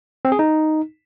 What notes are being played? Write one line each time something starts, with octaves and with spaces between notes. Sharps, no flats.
C4
G#4
D#4